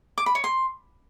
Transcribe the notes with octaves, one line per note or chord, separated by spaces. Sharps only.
D6
B5
C#5
C6